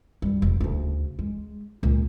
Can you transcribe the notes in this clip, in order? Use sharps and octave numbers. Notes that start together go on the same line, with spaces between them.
F#2 G3
E1
D2 C#3
G#3
C#2 A#2